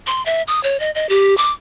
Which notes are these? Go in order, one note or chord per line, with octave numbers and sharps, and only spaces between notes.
C6
E5
D#6
C#5
D#5
D#5
G4
D6